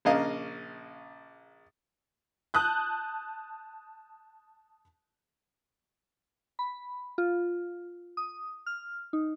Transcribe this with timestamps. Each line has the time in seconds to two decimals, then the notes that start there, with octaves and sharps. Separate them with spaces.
0.05 A#1 C#3 A#3 D#5 F5
2.54 A5 D#6 F#6 G6
6.59 B5
7.18 F4
8.17 D#6
8.66 F6
9.13 D#4